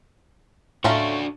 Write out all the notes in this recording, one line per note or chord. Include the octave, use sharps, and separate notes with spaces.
A2 A3 C#4 D4 F4 F#4 A#5